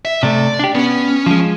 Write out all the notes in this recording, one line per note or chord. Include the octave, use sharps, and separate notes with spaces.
E5
C3 A3 D5
D4 G4
B3 C#4
F3 G#3